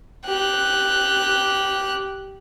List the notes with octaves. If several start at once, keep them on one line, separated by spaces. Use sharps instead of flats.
G4 F#6